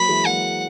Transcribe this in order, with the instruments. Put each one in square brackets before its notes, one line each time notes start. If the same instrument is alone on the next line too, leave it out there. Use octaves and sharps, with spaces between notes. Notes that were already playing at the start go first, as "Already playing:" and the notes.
Already playing: [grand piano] F#3 A#3 [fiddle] B5
[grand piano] E3 G#3
[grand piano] F#3 A#3 [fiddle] F#5